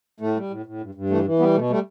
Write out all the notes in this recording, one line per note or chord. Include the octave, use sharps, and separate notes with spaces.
A2 A3
G3
A2
A2
G2
G2
E3 A3
E3
G3 B3
B2 A3
G3 A3